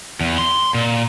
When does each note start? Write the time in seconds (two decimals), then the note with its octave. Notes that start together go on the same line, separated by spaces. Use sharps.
0.21 E2
0.38 C6
0.74 A#2